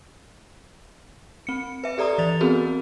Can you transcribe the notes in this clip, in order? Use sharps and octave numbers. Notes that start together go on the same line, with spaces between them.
C4 C#7
B4 E5
G4 A4 D5 A#5 D#6
E3 D5 A6 F7
B3 C4 F#4 G#4 A#4